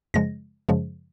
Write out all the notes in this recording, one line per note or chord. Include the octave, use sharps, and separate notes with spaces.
F#2 C#3 F3 G#3 A#6
F#2 C#3 F3 G#3